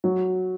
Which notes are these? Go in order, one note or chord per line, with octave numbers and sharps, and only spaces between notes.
F#3